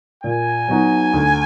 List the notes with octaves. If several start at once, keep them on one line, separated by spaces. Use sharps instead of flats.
A#2 G#5
F#3 B3 D#4 F#4
D2